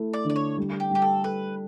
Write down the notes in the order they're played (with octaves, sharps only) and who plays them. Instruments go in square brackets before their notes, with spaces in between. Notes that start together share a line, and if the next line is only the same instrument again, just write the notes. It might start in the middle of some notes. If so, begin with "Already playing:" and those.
Already playing: [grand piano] A3 E4
[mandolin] D5
[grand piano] D3
[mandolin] D5
C#5
[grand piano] G3
[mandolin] G4
[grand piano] G3 [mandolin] G4
[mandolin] A4
[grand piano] A4 [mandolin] B4